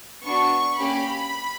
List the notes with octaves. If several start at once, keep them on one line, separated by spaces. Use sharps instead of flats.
B3 D4 F#4 C#6
A#3 C#4 G4 B5